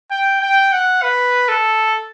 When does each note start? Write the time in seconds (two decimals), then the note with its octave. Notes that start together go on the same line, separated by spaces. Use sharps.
0.11 G5
0.41 G5
0.72 F#5
1.02 B4
1.48 A4